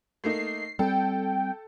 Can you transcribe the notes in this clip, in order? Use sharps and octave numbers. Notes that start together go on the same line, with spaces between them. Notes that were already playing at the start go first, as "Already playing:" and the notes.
A3 A#3 D#4 C7
G3 C4 A4 G5